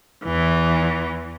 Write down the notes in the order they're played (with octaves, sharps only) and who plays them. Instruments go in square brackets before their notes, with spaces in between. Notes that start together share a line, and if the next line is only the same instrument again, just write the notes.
[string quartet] E2 E3